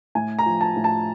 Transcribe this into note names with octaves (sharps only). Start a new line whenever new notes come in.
A2 G#5
A#5
F3
A5
A2
A5